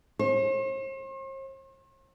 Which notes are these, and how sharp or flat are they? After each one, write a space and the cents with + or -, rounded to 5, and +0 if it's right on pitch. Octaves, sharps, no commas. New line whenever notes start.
C5 +45